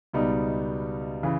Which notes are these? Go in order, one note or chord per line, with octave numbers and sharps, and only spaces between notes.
C#2 B2 G3 B3 D#4
C#3 E3